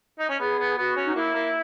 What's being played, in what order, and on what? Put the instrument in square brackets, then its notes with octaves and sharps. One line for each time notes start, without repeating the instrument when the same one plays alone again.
[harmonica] D#4
C#4
[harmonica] B3 [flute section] G#4
[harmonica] B3
[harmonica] B3 [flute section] F#4
[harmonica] C#4
[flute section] D#4
[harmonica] A#3 [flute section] E4
[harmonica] A#3